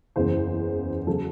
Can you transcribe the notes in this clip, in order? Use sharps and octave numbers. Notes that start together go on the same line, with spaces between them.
F#1 E2 C#3 E3 C5
C#3 F#3 A4